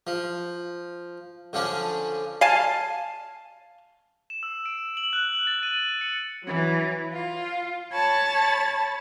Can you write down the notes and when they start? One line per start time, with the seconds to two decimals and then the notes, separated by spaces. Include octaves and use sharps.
0.07 F3
1.53 D3 F3 C#4 D4
2.41 F5 G#5 A5
4.30 E7
4.43 E6
4.66 D7
4.97 F#7
5.13 F#6
5.47 A6
5.63 D#7
6.01 C#7
6.44 E3 F#3
7.13 F4
7.93 C#5 A5 B5 A6